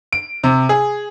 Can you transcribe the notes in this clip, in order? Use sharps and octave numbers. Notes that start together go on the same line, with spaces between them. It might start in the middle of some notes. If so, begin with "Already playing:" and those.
D7
C3
G#4